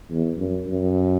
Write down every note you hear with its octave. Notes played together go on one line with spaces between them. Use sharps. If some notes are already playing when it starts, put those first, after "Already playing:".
E2
F#2
F#2